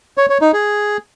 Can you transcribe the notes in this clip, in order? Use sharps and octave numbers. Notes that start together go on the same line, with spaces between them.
C#5
C#5
D#4
G#4